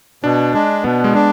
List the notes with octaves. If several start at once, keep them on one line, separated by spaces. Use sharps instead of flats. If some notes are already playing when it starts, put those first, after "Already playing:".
B2 D4
G#3 D4
B2 B3
G#3
D4